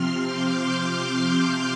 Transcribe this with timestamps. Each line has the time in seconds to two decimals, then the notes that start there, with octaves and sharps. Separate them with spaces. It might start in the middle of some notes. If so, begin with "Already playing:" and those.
Already playing: C3 F3 C4 C6 F6
0.22 D6 G6
0.56 C6 F6